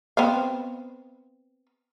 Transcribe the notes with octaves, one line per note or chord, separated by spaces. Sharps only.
B3 C4 F5